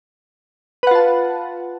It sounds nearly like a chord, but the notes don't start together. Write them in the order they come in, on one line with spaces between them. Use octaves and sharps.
B4 F#5 F4 A5